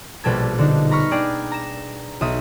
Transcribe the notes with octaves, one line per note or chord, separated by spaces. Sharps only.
A#1 B2 G3 A4 G#6
D3 D4 D#4
A#5 B5 C#6 F6 C#7
D4 G#4 D5 G5
A#5 E7
B1 E5 D#6